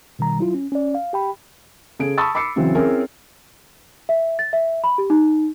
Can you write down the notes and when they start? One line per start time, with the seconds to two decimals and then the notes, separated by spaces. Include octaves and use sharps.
0.19 B2 D#3 G3 A#5
0.39 F#3 E4 F4
0.54 C#4
0.72 C#4 D5
0.95 F5
1.13 G4 G5 B5
1.99 C#3 G#4 A4 D7
2.18 A5 B5 C#6 D#6 E6 A6
2.35 B5 D6 E6 C7 C#7
2.56 C#3 E3 F#3 C4
2.75 C4 C#4 E4 G#4 A#4
4.09 E5
4.39 A6
4.53 E5
4.84 B5
4.98 G4
5.10 D#4